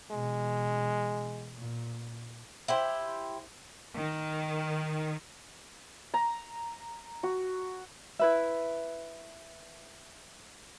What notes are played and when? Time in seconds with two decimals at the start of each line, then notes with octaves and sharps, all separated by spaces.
0.11 B2 E3 G#3
1.56 A#2
2.68 E4 G4 C5
3.97 D#3
6.14 A#5
7.23 F#4
8.19 E4 B4 E5